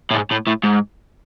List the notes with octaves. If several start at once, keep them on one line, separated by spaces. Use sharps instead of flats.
A2
G#2
A2
A2
G#2